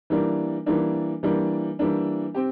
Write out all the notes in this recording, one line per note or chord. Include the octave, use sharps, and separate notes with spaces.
E3 G3 A#3 D4
E3 G3 A#3 D4
E3 G3 A#3 D4
E3 G3 A#3 D4
C4 G4